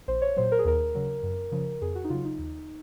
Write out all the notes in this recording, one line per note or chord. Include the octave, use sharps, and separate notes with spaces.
A#1 C5
C#5
A#2 F#3 C5
A#4
G#4
D#2 A#4
C#3 F#3
F#2
C#3 F3
F2 G#4
F#4
D#4
C#3 F#3 F4
D#4
D#2